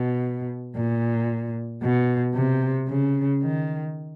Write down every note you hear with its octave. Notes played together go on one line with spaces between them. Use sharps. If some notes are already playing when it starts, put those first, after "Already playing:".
Already playing: B2
A#2
B2
C3
C#3
D#3